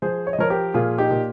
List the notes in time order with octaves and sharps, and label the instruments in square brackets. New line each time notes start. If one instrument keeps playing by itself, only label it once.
[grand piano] F3 G#4 C5
C#5
D#5
F3 A#4 C#5
G4 A#4
A#2 F4 G#4
D#4 G4
A#2